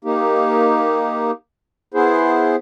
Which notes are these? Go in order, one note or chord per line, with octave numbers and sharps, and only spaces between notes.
A#3 D#4 G4
B3 E4 G#4 C5